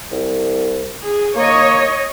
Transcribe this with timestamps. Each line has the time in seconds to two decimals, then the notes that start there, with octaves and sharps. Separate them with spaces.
0.11 C2
1.03 G#4
1.36 A#3 C#5 D#5